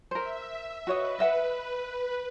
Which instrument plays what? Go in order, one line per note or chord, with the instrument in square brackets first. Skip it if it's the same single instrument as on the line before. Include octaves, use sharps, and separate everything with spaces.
[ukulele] A#4 C5 [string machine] E5
[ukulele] F#4 C#5 D#5 [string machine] B4
[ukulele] D#5 E5 F#5